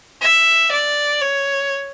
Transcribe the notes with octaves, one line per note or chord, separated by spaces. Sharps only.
E5
D5
C#5